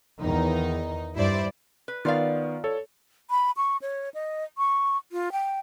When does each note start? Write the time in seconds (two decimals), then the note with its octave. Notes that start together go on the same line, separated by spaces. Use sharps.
0.21 E2 D#3 D#4
1.15 G2 E4 C5 D5
1.88 B4
2.05 D#3 B3 F4 D5 F5
2.64 A4 C#5
3.30 B5
3.57 C#6
3.82 C#5
4.14 D#5
4.58 C#6
5.12 F4
5.32 G5